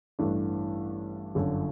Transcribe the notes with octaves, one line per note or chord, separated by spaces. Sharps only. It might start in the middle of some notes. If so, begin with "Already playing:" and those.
A1 G2 E3 A3 D4
G1 F#2 D3